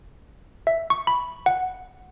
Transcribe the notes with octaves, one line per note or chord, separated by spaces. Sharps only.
E5
C#6
B5
F#5